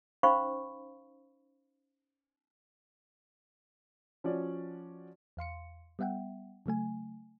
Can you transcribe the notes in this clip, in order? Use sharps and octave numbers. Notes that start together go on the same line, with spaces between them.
C#4 D#4 C5 F5 B5 C#6
F3 C#4 F#4 D5
E2 F5 C6 C#7
G3 B3 E5 F#5 G5
C#3 F#3 A3 G#5